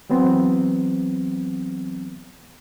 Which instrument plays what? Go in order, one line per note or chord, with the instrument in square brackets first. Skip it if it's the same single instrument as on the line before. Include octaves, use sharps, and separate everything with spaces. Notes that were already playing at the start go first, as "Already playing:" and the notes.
[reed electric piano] E3 F#3 B3 C4